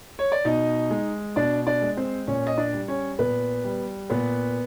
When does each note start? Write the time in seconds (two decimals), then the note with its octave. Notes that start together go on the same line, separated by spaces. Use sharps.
0.19 C#5
0.32 D5
0.45 B2 D#4 D#5
0.91 G#3
1.36 B2 D4 D5
1.67 D4 D5
1.82 G#3
1.97 C4 C5
2.27 A#2 C#4 C#5
2.47 D#5
2.58 D4 D5
2.73 G3
2.88 C#4 C#5
3.19 A#2 B3 B4
3.64 G3
4.10 A#2 B3 B4